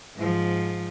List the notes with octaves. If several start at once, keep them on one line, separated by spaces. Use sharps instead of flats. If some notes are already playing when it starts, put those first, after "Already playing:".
G#2 F3